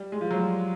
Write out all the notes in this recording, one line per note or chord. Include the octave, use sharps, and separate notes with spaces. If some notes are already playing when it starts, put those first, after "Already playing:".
Already playing: G3
G#3
F3
F#3
G3